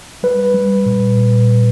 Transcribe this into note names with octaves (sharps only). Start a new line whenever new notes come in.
G3 B4
G3
A#2
A#2
A#2